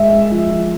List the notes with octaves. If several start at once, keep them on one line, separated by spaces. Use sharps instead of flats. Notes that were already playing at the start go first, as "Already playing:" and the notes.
Already playing: G#3 E5
G#3
F3
F3